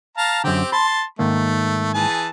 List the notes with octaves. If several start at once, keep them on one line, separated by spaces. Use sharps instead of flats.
F5 A5 A#5
F#2 D3 C4 G4
A5 B5 C6
G#2 D#3 A3 A#3
E3 G#4 A5